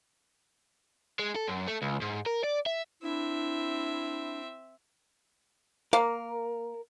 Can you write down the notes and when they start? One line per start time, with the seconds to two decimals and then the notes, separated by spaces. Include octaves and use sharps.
1.19 G#3
1.36 A4
1.48 F#2
1.68 A3
1.82 C#2
2.01 G#2
2.26 A#4
2.44 D5
2.66 E5
3.03 C4 D4 E4 E5
5.93 A#3 A#4